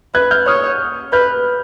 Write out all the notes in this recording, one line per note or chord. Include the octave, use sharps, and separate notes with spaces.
B4 F#6 G#6
F6 G6
C#5 D#6 F6
B4 F6 G6